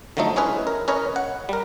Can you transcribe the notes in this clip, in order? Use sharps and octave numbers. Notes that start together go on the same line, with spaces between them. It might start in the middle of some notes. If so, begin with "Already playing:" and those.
D3 F3 F#3 A3 D#4
G#3 C#4 E4 G#4 B4
A#4
C#4 A#4 B4 C#5 D#5
F#5
G3 A#4